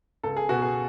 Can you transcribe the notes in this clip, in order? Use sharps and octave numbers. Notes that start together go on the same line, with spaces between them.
C#2 A4
G#4
B2 F#4
G#4